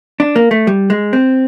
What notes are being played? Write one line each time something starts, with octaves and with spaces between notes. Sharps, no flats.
D4
A#3
A3
G3
G#3
C4